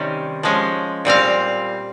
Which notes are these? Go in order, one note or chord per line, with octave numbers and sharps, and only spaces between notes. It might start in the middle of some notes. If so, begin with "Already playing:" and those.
Already playing: C3 D#3 G3 C#4
F3 G#3 C#4
A#2 G3 C4 F5